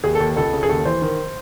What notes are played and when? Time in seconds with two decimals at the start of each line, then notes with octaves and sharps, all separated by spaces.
0.04 D#2 G#4
0.15 A4
0.20 D#2
0.36 C#2 A4
0.53 C#3
0.63 G#4
0.69 D#2 A4
0.85 E3 C5
1.02 D#3